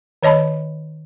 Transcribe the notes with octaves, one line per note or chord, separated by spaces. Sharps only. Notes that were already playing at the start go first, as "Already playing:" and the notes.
D#3 C#5 D#5 A5 B5